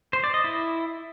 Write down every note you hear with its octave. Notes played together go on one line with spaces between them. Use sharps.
C5
D5
D#5
E4